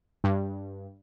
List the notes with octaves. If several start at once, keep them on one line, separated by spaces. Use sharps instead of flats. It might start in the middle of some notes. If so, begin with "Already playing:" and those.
G2